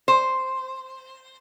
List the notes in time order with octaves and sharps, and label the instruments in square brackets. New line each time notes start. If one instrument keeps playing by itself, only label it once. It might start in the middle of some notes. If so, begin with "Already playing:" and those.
[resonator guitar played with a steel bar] C5